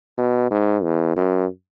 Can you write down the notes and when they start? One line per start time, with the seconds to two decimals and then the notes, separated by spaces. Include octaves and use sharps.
0.18 B2
0.51 G#2
0.83 E2
1.17 F#2